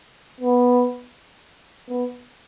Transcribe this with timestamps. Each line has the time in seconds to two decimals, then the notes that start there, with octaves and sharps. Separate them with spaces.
0.40 B3
1.89 B3